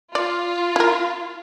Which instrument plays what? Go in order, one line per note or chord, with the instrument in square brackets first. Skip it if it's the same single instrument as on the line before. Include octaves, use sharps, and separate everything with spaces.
[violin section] F4 [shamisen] D5
[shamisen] E4 A#4